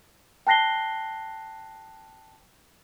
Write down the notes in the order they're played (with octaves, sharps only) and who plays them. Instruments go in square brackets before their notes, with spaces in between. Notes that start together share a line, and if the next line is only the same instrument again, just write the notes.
[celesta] G5 A5 F#6 A#6 C7 G7